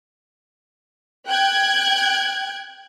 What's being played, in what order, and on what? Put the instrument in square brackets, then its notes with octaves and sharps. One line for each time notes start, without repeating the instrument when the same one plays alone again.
[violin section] G5 F#6 G#6